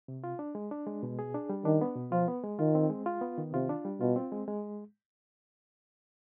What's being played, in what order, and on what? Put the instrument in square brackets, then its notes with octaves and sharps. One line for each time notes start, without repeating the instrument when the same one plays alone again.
[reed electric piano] C3
F4
D4
G#3
D4
G#3
B2
G#4
D4
G3
[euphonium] D#3 [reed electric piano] D4
[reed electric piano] B3
B2
[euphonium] F3 [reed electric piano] F4
[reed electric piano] B3
G#3
[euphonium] D#3 [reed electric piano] F4
[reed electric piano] C4
G#3
F4
B3
D#3
[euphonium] C3 [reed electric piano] F4
[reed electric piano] D4
G3
[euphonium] B2 [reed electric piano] F4
[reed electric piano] C4
G#3
G#3